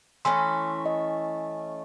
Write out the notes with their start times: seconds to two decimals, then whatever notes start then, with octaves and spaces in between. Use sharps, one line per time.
0.25 E3 A3 C#4 C6
0.86 D#5